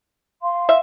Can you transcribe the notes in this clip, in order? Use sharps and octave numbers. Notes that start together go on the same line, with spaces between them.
F5 C6
E5